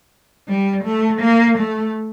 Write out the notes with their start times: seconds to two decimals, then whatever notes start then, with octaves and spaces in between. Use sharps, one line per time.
0.47 G3
0.84 A3
1.21 A#3
1.57 A3